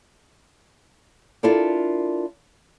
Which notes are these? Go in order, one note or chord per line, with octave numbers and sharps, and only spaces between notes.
D4 E4 F4 A4 A#4 D5